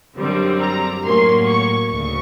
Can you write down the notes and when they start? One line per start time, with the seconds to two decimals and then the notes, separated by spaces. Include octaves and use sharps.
0.18 F#2 D3 G3 C4
0.62 A#5
1.04 A2 F#3 A#3 C#4 C6
1.47 C#6
1.90 D2 C#3 C#6